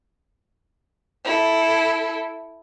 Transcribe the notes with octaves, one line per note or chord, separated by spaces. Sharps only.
E4 A4